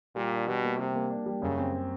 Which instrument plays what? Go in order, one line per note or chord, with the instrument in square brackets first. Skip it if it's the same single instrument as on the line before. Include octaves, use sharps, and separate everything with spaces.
[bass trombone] A#2 [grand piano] G3
[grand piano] D4
[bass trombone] B2 [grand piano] G3
[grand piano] A#3
[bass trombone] C3 [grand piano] G3
[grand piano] A#3
D4
G3
[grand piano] F#2 [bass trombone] C#3
[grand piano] C4